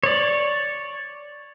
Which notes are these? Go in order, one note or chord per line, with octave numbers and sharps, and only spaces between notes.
C#5 D5